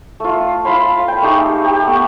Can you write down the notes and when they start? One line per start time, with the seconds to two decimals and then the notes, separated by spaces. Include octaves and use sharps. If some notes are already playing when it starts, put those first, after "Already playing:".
0.20 A3 F4
0.65 F4 F5 B5 C6
1.08 G5 B5
1.22 A3 D#4 G4 G#4
1.64 G4
1.86 A3 B3